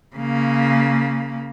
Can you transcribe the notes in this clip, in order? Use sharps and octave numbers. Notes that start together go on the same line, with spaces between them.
C#3 A#3